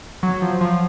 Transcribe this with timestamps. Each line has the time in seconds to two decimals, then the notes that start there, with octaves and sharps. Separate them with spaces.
0.23 F#3
0.42 F3
0.61 F3